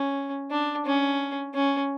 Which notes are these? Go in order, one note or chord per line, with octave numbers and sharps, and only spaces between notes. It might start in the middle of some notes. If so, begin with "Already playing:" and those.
Already playing: C#4
D4
C#4
C#4